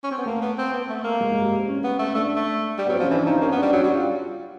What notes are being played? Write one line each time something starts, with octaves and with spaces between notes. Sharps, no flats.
C#4
C4
B3
A3 A#3
B3
C4
B3
A3
A#3
G#3
G#3
G3
C4
C#4
B3
A3
A3 D4
A3
G3
B3
F#3
C4
F3
C#4
E3 D4
F3 D#4
A#3 C#4
B3
D4
G3
F#3 F#4
G3 G4
F4